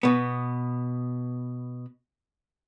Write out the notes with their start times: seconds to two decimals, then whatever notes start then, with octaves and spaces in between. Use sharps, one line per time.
0.03 B2 B3